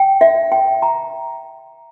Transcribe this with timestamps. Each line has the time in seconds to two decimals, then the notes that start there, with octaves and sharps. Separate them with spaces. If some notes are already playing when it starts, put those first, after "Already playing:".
Already playing: G5
0.21 E5
0.52 G5
0.82 A#5